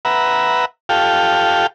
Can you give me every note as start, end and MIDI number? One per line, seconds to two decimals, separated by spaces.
0.05 0.65 71
0.05 0.65 76
0.05 0.65 78
0.05 0.65 82
0.89 1.67 65
0.89 1.67 67
0.89 1.67 69
0.89 1.67 77
0.89 1.67 79